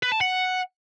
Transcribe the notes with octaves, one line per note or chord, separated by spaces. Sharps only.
B4
A5
F#5